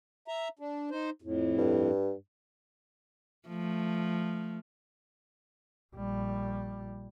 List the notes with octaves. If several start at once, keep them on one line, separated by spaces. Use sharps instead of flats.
E5 A#5
D4
D#4 C5
F2 A2
G2
F3 A3
A#1 G3